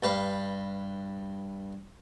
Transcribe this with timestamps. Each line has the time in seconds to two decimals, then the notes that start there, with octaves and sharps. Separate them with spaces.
0.03 G2 B4 F5